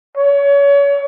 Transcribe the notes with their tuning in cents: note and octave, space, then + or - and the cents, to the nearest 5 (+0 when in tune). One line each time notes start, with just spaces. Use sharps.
C#5 +30